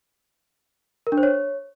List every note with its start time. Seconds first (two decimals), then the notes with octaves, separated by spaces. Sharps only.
1.07 A#4
1.12 D4
1.18 C5
1.23 C#5